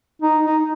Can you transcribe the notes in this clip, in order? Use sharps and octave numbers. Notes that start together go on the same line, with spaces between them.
D#4
D#4